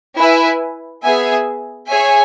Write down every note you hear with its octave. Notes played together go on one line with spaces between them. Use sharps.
E4 B4 E5 G#5
B3 G#4 E5 G#5
G#4 C#5 E5 G#5